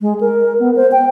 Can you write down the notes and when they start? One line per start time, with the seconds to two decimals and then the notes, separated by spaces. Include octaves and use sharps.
0.01 G#3
0.21 A#4
0.60 B3
0.76 C5
0.92 G5